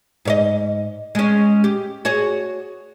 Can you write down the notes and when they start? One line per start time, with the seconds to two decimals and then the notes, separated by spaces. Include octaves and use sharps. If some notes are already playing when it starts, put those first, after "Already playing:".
0.25 G#2 C#5 D#5
1.15 G#3 C#4
1.64 G4
2.05 F#4 G#4 C#5